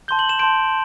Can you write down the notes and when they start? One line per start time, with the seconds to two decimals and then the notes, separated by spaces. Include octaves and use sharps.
0.08 A5 C6 G6 G7
0.19 F#7
0.29 E7
0.39 A5 C6 G6 D7